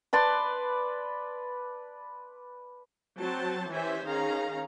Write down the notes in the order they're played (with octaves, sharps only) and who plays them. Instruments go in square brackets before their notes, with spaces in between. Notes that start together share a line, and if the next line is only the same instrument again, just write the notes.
[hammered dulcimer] B4 D5 A5 C6
[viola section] F#3 C4 C5 A5
E3 C#4 G4 C5 E5 G#5
D#3 C#4 G#4 F5 A#5